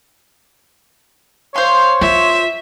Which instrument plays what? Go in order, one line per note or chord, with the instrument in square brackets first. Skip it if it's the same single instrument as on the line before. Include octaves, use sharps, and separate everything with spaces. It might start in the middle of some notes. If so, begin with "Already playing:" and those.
[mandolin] C5 C6 [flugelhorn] C#5 [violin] F5
[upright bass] F4 [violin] E5